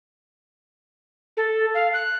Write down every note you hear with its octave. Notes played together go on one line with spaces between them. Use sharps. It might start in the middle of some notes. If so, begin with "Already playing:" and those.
A4
F5
F#6